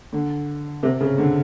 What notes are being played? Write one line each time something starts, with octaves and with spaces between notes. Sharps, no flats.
D3
C3
C#3
D3